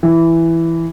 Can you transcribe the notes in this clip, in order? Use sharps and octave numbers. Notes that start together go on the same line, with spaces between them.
E3